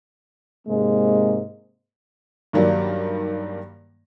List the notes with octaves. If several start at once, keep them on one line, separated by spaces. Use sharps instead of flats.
G#2 C3 G#3 A#3
G2 D#3 F#3 G3 A#3